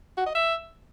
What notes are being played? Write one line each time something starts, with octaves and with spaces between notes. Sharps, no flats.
F#4
D#5
E5